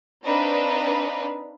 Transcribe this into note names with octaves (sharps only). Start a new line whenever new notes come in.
C4 D4 D#4 B4 F5